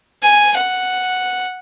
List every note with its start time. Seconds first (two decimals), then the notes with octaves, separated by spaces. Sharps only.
0.23 G#5
0.56 F#5